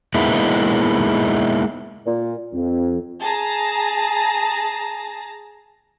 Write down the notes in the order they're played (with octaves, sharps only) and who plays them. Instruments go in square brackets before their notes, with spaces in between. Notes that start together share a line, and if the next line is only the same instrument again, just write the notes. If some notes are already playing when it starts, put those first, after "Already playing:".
[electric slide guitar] G#3 A#3 B3 D#4 E4
[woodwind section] A#2
[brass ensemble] F2
[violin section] G#4 A5 A#5